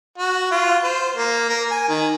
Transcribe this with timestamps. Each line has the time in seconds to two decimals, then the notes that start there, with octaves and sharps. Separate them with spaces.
0.18 F#4
0.51 F4
0.83 C5
1.16 A#3
1.49 A#4
1.71 G#5
1.89 D#3